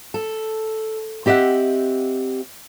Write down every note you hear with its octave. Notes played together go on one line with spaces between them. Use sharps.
A4
C4 G4 D#5 E5 F#5